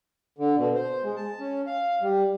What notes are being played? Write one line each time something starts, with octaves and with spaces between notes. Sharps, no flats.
D3
B2
C5
G#3
A5
C#4
F5
G3